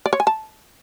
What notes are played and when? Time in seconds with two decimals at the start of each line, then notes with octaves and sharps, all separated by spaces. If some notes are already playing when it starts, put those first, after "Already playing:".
0.06 D5
0.13 C#5
0.20 G#5
0.27 A5